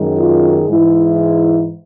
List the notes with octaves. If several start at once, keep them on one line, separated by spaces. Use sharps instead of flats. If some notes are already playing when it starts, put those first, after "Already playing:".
Already playing: F#2 D#3 G#3
F4
G#2 E3 G#3 E4